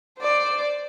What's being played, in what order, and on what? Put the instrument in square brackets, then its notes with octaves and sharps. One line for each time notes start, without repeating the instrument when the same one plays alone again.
[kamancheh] C5 D5